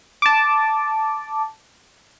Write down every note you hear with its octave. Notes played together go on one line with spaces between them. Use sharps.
A5 D6